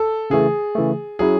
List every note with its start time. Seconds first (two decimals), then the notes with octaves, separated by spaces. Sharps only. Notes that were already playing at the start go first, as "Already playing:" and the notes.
Already playing: A4
0.30 C#3 E3 A3 G#4
0.75 C#3 E3 A3
1.19 F#3 C#4 E4 G#4